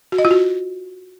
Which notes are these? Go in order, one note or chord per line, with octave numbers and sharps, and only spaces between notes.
F#4
D#5
F4
F#4